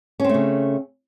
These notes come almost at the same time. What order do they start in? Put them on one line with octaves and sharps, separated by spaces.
C#4 C4 A3 C#3